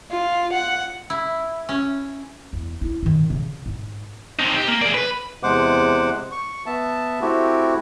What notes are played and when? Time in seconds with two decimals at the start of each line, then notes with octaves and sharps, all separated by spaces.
0.11 F4
0.53 F#5
1.10 E4
1.69 C#4
2.53 E2
2.81 E4
3.03 G#2 D#3
3.30 C#3
3.66 G#2
4.39 C4 D#4
4.56 G4
4.68 A#3
4.82 G#4 D5
4.94 B4
5.43 E2 C3 G#3 C5 F#5 D6
6.32 C#6
6.66 B3 E5 A5
7.21 A3 C4 E4 F#4 G4